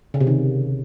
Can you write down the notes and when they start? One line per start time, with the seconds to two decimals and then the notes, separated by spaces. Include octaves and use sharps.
0.14 C#3
0.21 C3
0.27 D#3